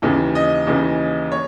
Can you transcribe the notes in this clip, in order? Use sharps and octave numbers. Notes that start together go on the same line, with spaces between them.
D#2 C#3 E3
D#5
D#2 C#3 E3
C#5